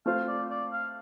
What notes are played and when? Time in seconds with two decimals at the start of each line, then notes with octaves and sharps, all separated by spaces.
0.06 A3 C4 F4 C5 F5
0.28 D5
0.50 D5
0.72 F5